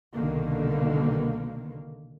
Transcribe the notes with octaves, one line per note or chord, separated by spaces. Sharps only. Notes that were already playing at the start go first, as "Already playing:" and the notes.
C2 B2 D3 D#3 A#3